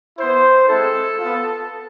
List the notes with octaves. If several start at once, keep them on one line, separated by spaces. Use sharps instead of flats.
B3 E4 C5
G#3 C4 E4 A4
B3 F4